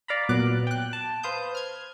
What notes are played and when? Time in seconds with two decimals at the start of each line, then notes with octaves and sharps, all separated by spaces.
0.08 D5 F5 A#5 B5
0.29 A#2 F#3 B3 D6 F#6
0.67 G5 F#6
0.93 A5
1.23 B4 C5 F5 D#6 G6
1.55 F6 G#6